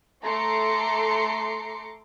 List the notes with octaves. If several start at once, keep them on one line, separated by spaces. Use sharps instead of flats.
A3 A#5 C6 D6 C7 C#7